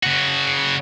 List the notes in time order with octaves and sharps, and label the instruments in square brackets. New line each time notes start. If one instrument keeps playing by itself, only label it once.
[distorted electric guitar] C#3 F#4